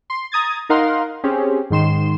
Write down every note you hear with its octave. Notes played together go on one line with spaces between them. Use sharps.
C6
A#5 D#6 G#6 A6
D#4 A#4 F5 F#5 A#5 C6
C4 C#4 G4 G#4
G#2 D#3 C6 E7